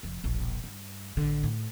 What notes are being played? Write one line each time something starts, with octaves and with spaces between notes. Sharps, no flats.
F1 F3
E1 A#1
G2
A1 D3
A2